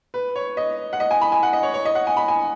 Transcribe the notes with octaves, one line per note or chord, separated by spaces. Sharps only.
B4
C#5
D#5
F#5
D#5
G#5
B5
G#5
F#5
D#5
C#5
C#5
D#5
F#5
G#5
B5
G#5